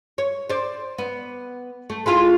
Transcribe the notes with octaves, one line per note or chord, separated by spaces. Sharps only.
C#5
C5 D5
B3
A3
G#3 E4 F4